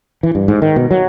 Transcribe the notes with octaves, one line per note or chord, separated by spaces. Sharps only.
E3
G2
G#2
D#3
B2
F#3